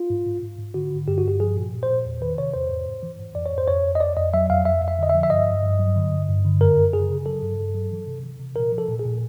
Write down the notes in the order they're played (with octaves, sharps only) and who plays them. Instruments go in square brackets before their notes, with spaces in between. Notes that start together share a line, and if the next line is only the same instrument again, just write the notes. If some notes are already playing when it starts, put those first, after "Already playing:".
Already playing: [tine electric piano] F4
G#2
G#2
G#2
G#2
D3 F#4
D3
G2 G4
F#4
G2 G4
F3 G#4
A#2
A#2
C5
A#2
E2
D#3 B4
C3 C#5
E2 C5
G#2
G#2
E3
G#2
F2 D5
C#5
F2
C5
F2 C#5
F2
D#5
F2 D5
F2 D#5
F#3 E5
F2 F5
F2 E5
F2
E5
D3 D#5
E5
F3
E5
G2 D#5
G2
G2
F#3
D3
G2
G2
D3
F#2 A#4
F#2
C#3 G#4
C#3
F#3 A4
G2
G2
F#3
E3
C3
E3
C3
A#2 A#4
F3
A4
A#2
G#4
A#2